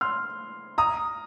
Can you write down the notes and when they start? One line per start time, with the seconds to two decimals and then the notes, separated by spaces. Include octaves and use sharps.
0.01 C6 F6
0.78 A#5 D#6